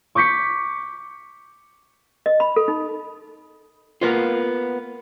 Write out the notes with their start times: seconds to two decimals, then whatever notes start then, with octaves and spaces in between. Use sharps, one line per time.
0.15 C#6 D6 G6 B6 C#7
2.26 D#5
2.40 B5
2.56 A4
2.68 D#4
4.01 A#3 B3 F4